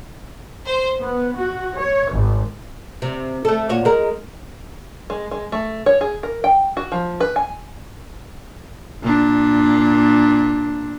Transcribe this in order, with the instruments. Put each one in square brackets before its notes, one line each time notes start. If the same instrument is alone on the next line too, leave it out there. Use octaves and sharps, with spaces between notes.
[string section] C5
B3
F#4
C#5
G#1
[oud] C3
A3 A4
A#2 F#4 C#5
G#3 A#4
[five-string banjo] G#3
G#3
A3
C#5
G#4
A#4
G5
F#4
F3
B4
G#5
[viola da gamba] A#2 D4